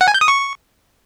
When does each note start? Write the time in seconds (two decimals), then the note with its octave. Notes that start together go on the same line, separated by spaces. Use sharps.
0.01 F#5
0.08 G#5
0.14 G6
0.21 D#6
0.28 C#6